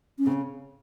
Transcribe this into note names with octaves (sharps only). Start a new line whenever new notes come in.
C#4
C#3 C4